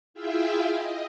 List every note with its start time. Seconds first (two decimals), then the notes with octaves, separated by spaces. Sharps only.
0.14 E4 F4 G#4 E5 F5 G5
0.72 D#5